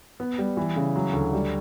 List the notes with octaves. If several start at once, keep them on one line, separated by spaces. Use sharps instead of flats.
B3
G3
E3
C#3
F#3
D2
G3